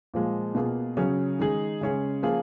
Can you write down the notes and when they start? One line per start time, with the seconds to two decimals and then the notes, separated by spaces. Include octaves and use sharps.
0.14 A#2 F3 G#3
0.55 B2 A#3 F4 G#4
0.97 C#3 F#3 C#4 G#4
1.39 D#3 G#3 D#4 G#4
1.81 C#3 G#3 C#4 G#4
2.23 F3 A#3 F4 G#4